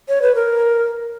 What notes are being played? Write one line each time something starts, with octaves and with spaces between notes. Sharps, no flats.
C#5
B4
A#4